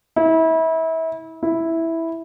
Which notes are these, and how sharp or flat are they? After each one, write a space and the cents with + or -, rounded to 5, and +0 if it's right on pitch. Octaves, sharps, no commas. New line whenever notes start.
E4 -30
E4 -5